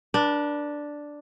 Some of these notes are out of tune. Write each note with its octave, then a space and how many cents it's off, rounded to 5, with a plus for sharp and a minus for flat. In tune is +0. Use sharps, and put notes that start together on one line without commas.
D4 +0 B4 -45